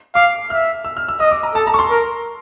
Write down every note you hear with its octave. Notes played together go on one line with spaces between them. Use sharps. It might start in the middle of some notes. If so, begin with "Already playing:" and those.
F5 D6
E5 F6
E6
F6
E6
D#5 D#6
D6
A#5
A4 A5
A#5
C#6
C6
A#4